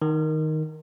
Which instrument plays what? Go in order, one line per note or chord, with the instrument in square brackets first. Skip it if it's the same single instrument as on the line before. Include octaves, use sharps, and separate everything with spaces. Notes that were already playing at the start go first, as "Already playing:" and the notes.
[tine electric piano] D#3